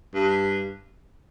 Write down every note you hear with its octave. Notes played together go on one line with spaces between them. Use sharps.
G2